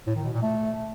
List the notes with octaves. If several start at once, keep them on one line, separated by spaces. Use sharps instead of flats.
A2
D#3
B2
A#2
A3